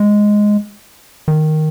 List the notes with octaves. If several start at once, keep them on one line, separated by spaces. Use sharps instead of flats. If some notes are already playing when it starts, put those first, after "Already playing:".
Already playing: G#3
D#3